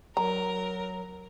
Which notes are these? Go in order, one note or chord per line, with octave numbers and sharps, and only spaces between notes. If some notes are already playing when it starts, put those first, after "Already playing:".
F#3 A#4 A#5